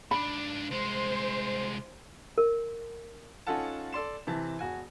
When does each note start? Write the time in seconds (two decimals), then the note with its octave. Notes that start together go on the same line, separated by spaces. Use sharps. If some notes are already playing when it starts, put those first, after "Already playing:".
0.11 G#2 D4 B5
0.71 C2 G#3 C5
2.38 A#4
3.47 C#4 D#4 F4 A4 F#5 A5
3.93 A4 D5 C6 E7
4.27 C3 E3 A5
4.59 E1 F#4 G#5